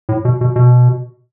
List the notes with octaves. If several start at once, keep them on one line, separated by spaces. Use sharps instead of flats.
A2
B2
B2
B2